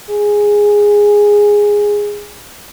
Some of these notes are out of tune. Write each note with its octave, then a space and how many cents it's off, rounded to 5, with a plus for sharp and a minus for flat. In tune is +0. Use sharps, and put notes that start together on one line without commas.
G#4 -5